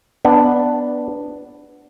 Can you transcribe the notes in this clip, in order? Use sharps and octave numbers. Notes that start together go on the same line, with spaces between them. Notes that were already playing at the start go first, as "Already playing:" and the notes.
B3 D4